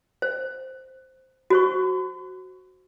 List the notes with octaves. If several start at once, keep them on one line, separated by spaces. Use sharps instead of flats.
C5
F#4 C5 C#6